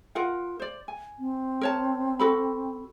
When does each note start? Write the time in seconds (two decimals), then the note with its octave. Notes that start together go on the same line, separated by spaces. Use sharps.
0.15 F4 A#4 F#5
0.60 C5 D5
0.88 G#5
1.19 C4
1.61 A#4 C#5 A5
2.19 F#4 A4 B5